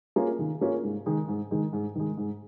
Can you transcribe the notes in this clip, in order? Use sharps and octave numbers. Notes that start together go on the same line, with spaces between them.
A#3 C#4 F4 G#4
D#3
A#3 C#4 F4 G#4
G#2
D#3 G#3
G#2
D#3 G#3
G#2
D#3 G#3
G#2